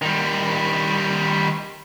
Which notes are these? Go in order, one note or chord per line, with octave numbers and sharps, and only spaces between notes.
D#3 G3